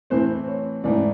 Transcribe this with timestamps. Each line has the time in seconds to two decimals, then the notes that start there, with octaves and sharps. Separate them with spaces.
0.10 A2 E3 A3 C4 C5
0.47 C#5
0.84 G#2 E3 A3 D5